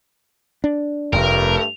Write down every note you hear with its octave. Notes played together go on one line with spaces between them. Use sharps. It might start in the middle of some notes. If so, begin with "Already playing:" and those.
D4
F1 G2 A3 A#4